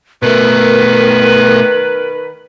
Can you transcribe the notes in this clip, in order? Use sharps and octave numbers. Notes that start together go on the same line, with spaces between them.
B2 D#3 A3 A#4 B4